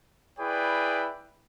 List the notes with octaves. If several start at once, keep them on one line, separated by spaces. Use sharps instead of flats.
E4 G#4 B4 D5 G5